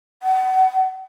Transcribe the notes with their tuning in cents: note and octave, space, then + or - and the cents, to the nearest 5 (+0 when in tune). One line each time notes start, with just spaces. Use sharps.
F#5 +25